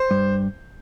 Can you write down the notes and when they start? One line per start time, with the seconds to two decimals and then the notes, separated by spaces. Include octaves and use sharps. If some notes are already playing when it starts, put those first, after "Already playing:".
Already playing: C5
0.11 G2